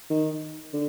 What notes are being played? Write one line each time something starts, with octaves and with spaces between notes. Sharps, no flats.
D#3
D3